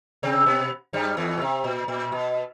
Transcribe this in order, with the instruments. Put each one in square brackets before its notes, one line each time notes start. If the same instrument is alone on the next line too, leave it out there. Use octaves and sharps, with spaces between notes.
[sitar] C3 C4
B2 B3
G2 G3
E2 E3
B2
C3
A#2
A#2
B2